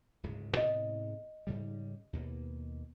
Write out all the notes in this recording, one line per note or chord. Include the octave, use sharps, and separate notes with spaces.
D1 G#2 C#3
G#2 C3 B3 D#5
G#2 C#3 G3
D#2 B2 A#3